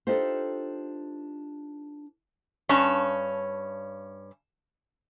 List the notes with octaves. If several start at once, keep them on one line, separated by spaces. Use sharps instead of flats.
D4 D#4 F4 G4 A4 C5
G2 C#4 A5